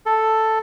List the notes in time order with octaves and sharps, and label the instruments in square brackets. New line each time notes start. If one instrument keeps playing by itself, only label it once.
[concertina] A4